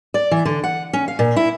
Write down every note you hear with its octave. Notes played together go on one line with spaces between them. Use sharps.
D5
E3
D3
F#5
C#4
F5
A#2
E4